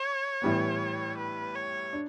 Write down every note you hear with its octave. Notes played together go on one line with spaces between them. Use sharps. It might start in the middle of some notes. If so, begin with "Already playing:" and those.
Already playing: C#5
A2 E3 G3 B3
B4
C#5
D4